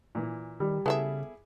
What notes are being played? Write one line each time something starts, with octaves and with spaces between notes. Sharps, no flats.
A#2 E3
D#3 G3
C#3 B3 E4 G#4 A4 E5